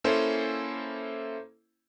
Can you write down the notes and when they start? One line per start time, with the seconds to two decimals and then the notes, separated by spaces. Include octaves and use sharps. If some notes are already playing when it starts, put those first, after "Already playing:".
0.04 A#3 C#4 E4 A4 C5